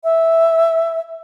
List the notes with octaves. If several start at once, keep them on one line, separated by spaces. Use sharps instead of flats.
E5